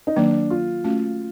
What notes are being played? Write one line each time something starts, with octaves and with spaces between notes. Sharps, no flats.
D#4
D#3 F#3 A#3 D4
F4
A3 C#4 F#4